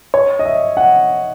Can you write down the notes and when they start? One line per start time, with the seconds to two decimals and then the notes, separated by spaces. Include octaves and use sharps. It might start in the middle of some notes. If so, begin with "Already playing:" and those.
0.14 C#5
0.39 D#5
0.45 E5
0.77 F#5